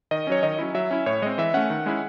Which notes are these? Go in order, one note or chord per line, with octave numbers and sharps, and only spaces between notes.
D#3 D#5
F#3 C#4 C#5
D#3 D#5
F#3 C#4 E4
F#3 E5
C#4 E4
A2 C#5
G#3 C4 D#5
E3 E5
A3 C#4 F#5
D#3
G#3 C#4 E4